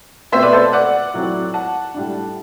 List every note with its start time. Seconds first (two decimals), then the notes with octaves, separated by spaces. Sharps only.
0.32 B2 A3 C4 C5 E5
0.42 B4 D5
0.53 A4 C5
0.73 D5 F#5
1.14 A2 F#3 C4 E4
1.54 F#5 A5
1.94 A2 G3 D4